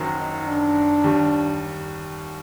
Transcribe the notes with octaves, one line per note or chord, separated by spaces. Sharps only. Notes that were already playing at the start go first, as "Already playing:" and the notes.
Already playing: F#1 F#2 D#3 F#3
D#4
D4
D#2 D#3 G3